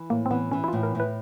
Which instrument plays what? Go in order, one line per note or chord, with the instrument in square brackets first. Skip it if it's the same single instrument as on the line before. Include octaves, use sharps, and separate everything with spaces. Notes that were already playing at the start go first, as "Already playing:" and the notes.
Already playing: [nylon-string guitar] E3
[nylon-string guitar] A2 [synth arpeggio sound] A#3
[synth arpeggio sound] C4
[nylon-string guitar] E3 [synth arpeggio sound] B3
[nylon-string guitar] E3 [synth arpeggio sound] C#4
[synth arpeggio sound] E4
[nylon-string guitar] A2 [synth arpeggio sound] F4
[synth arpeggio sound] A#4
[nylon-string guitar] A2 [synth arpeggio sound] B4